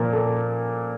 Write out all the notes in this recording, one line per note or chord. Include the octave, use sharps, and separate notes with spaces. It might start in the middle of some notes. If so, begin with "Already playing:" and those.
Already playing: A#2 F3 A#3 A#4
A4